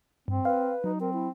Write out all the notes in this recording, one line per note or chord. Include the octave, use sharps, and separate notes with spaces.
G2 C4
B4 F5
F#3 D#4
C4 A#4
E4